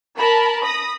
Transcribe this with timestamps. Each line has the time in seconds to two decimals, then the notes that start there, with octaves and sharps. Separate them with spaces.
0.18 A#4 A5 B5
0.63 B5 D#6 A#6